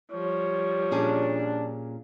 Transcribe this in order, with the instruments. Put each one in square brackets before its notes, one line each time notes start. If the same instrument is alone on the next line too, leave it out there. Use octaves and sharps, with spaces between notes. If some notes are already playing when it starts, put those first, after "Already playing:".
[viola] F3 G3 [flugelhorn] C#5
[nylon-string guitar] A#2 C#4 G#4 [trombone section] D4